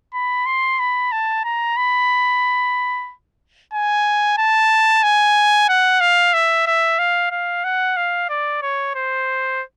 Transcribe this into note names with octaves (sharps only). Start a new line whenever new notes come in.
B5
C6
B5
A5
A#5
B5
G#5
A5
G#5
F#5
F5
E5
E5
F5
F5
F#5
F5
D5
C#5
C5